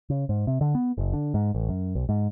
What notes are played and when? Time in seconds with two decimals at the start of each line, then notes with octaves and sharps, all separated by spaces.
0.10 C#3
0.29 G#2
0.47 C3
0.61 D3
0.75 B3
0.98 F#1
1.13 D3
1.34 G#2
1.55 A1
1.69 F#2
1.95 B1
2.09 G#2